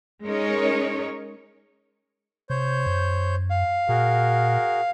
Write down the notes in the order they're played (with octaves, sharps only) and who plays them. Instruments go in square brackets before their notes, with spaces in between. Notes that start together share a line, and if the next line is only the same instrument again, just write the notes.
[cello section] G#3 C#4 D#4 A#4 C#5
[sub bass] C3 [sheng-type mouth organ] C5 C#5 G6
[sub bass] F#2
[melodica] F5
[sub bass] A#2 [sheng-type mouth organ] F#4 G#4 A#4